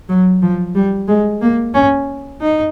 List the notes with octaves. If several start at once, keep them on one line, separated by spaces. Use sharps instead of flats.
F#3
F3
G3
G#3
A#3
C#4
D#4